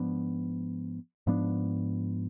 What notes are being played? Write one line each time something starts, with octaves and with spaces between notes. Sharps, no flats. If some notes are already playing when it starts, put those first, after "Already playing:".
Already playing: G#2 F3 B3 D4
G#2 F3 B3 D4